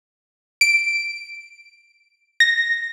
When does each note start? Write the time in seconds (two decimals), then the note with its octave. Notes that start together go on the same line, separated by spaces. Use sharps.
0.61 D7
2.40 A#6